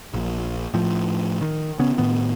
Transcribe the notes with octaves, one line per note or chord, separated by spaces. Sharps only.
A#1
A2 F3
D#3
C#3 B3 C#4
A2 D#3 B3